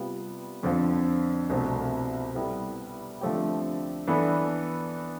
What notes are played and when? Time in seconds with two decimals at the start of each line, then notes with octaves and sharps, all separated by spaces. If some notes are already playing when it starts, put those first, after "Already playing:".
Already playing: C3 G3 B3 F4
0.63 F2 D3 F3 C4
1.49 C2 B2 A3 C4
2.35 G3 B3 E4 A4
3.21 D3 F3 A3 C4 G4
4.07 E3 B3 D4 A4